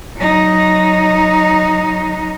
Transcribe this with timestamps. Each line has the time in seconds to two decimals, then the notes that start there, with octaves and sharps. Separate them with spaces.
0.17 F#3 D#4